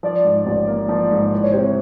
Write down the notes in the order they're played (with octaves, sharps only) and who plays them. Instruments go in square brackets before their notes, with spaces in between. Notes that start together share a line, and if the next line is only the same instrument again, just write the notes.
[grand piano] F3 [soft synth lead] D5
[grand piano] G#2
A1
A#3
F3
G#2
[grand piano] E3 [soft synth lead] D5
[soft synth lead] C#5
[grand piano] C3 [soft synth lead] C5
[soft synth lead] C#5